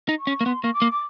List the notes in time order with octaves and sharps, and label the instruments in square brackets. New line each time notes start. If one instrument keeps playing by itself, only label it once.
[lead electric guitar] D#4
[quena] C#6
[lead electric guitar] C#4
A#3
[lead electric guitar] B3 [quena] C6
[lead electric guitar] A#3 [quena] C#6
[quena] D6
[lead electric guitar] A#3
[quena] D6